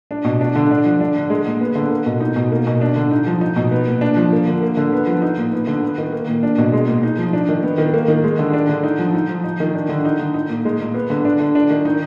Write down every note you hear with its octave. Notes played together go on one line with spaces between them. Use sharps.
D4
B2
D4
D3
D4
F3
D4
D3
G#3
A#2
B3
D3
A#3
B2
D#4
B2
A#3
B2
D4
D3
D#4
F3
D#4
B2
B3
A#2
D4
F3
A#3
D3
A#3
D3
B3
F3
D#4
A#2
B3
D3
B3
D#3
A#3
A#2
D4
B2
G#3
A#2
D#4
F3
D4
D#3
B3
D#3
A#3
D#3
G#3
D3
D4
D3
D#4
F3
D#4
F3
D#4
D#3
D4
D3
D#4
D3
D#4
A#2
G#3
A#2
B3
D3
D4
D3
D4
D#3
D#4